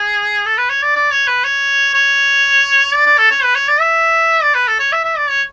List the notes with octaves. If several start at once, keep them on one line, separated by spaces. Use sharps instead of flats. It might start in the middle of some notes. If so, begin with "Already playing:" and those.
Already playing: G#4
A4
B4
C#5
D5
D5
C#5
B4
C#5
C#5
D5
D5
A4
C#5
B4
C#5
D5
E5
D5
B4
A4
C#5
E5
E5
D5
C#5